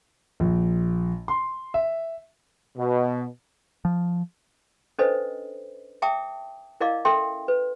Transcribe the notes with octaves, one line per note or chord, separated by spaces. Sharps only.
A#1
C6
E5
B2
F3
C#4 D4 A4 B4 C5 D#5
E5 G5 A5 D6 D#6
E4 A#4 D5 D#5 F5 D6
C#4 A4 A#4 E5 G5 C6
B4